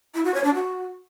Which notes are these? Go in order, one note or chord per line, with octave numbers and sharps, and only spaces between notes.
E4
F#4
C#5
D4
F#4